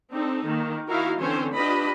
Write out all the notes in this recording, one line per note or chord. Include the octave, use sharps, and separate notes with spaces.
C4 D4 D#4 A4
D#3 A#3
D#4 E4 F#4 A#4 F5
D3 E3 C4 C#4 C5 C#5
D4 F4 G4 B4 D#5 B5